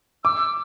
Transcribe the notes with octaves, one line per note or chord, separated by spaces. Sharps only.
D6 E6